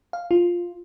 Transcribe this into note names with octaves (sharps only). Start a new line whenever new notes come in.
F5
F4